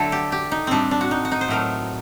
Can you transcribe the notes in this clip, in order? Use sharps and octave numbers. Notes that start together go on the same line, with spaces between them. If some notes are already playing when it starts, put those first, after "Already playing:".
Already playing: D3 F#3 A3 A4
G4
G4
D#4
A2 G3 C4 D4
D4
F#4
D#4
F#4
D#4
C5
A2 F#3 A3 A#4